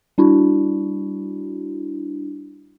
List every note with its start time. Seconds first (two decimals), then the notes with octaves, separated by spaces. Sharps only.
0.18 G3 D4 E4 F#4